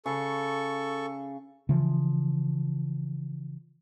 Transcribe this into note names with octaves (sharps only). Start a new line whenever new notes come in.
C#3 A4 C#6
C#3 E3 F3